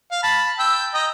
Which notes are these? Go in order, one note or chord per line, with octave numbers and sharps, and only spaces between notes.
F5
A5 B5
G5 E6
D#5 G5 A#5